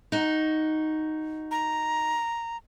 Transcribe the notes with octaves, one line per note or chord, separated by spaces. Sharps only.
D#4 F#4
A#5